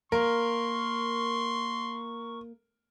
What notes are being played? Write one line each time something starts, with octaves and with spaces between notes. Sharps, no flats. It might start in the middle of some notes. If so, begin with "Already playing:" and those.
A#3 A#4 C6 C#6